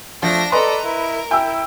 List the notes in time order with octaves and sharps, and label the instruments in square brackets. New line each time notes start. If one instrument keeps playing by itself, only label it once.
[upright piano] F3 [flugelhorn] A3 [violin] D4 A#6
[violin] A4 A#5 [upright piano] B4 D#5 C6 [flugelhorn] D5
[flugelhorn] E4 [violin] A#4
[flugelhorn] E4 [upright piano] G5 E6